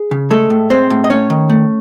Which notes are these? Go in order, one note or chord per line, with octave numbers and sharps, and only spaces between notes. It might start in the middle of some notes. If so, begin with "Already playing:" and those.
Already playing: G#4
C#3
G#3 A3 A4
A2
G#3 C4 C5
A2
D#5
A3 C#4 C#5
D#3
A3